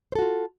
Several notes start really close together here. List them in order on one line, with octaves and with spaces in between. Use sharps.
C5 A4 F#4 F4